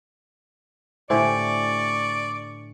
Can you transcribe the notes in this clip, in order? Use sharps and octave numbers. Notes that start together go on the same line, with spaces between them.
A2 D3 G4 C5 D5 E5 G#5 C#6